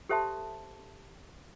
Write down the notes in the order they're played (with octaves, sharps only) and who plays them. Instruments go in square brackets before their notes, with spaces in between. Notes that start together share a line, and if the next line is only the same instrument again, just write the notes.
[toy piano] G4 A4 C5 E5 A5 C6